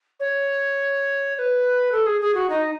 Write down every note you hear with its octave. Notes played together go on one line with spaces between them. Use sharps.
C#5
C#5
B4
A4
G#4
G#4
F#4
D#4